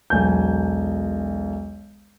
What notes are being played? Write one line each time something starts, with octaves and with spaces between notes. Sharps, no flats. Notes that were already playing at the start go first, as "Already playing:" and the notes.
E1 B1 G#5 G6